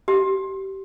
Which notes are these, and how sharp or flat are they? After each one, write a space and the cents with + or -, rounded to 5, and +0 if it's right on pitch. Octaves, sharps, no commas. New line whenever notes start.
G4 -25